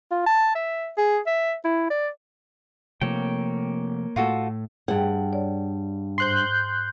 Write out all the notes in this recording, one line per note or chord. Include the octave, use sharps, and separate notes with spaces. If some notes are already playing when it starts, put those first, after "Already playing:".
F4
A5
E5
G#4
E5
E4
D5
C3 F3 A3 A#3 C#5 G5
A2 A3 F4 F#4 A4
G2 G#4 F#5 G5
C#5 D5
G#2 C5 C6 F#6 G6